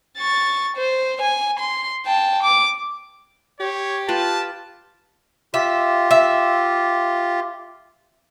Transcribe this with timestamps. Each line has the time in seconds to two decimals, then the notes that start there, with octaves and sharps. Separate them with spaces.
0.18 C#6 A6
0.77 C5
1.22 G#5
1.59 C6
2.06 G5 A5
2.43 D6
3.60 G4 C#5
4.08 F4 B4 G5 A5
5.54 F4 G4 E5
6.11 E5